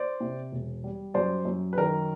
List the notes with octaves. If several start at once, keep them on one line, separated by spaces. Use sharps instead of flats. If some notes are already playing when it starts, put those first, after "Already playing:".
Already playing: C5 D5
C3
E1
G3
F#2 C5 D5
F#2
B4
D#3 A#4